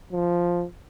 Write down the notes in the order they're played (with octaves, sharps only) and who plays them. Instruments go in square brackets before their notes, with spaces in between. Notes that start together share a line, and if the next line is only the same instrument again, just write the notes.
[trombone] F3